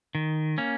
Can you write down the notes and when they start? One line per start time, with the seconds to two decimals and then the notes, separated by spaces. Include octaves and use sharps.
0.15 D#3
0.58 A#3 C#4